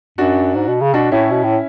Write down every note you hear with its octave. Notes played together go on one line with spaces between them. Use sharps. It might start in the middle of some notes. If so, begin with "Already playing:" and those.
F#2 D4 F#4
G#2
B2
C#3
B2 D4 F#4
A2 C#4 E4
B2
A2